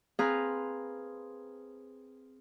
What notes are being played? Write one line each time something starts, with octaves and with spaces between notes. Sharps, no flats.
C4 G#4 B4 F5 A#5